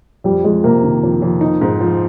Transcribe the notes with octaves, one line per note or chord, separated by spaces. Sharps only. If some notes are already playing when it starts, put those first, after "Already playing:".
F2 G3
F2 G#3
C3 A#3
D#3
F2
F2
D#4
G#2
F3